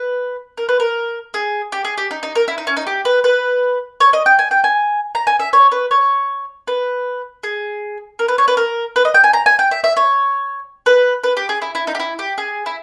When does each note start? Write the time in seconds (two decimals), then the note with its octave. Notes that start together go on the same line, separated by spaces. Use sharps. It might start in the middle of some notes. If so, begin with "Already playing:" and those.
Already playing: B4
0.57 A#4
0.69 B4
0.80 A#4
1.34 G#4
1.72 G4
1.85 G#4
1.98 G4
2.11 D#4
2.23 D#4
2.35 A#4
2.48 E4
2.58 D#4
2.67 C#4
2.77 D#4
2.87 G4
3.05 B4
3.24 B4
4.00 C#5
4.13 D#5
4.26 G5
4.39 G#5
4.51 G5
4.64 G#5
5.15 A#5
5.27 G#5
5.40 E5
5.53 C#5
5.72 B4
5.91 C#5
6.67 B4
7.43 G#4
8.19 A#4
8.28 B4
8.38 C#5
8.48 B4
8.57 A#4
8.96 B4
9.05 D#5
9.14 G5
9.24 G#5
9.33 A#5
9.46 G#5
9.59 G5
9.71 E5
9.84 E5
9.97 C#5
10.86 B4
11.24 B4
11.37 G4
11.49 G#4
11.62 E4
11.75 E4
11.87 D#4
11.95 G4
12.00 E4
12.19 G4
12.38 G#4
12.66 E4